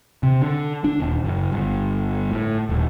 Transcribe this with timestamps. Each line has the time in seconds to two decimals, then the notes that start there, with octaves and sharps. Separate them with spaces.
0.23 C3
0.42 D3
0.84 D4
1.00 D#1
1.24 F#1
1.52 G1
2.31 A2
2.69 D#1